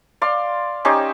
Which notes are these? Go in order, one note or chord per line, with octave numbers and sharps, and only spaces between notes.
D5 F5 C6
C#4 D#4 G4 C5